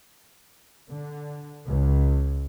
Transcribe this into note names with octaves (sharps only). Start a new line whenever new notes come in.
D3
C#2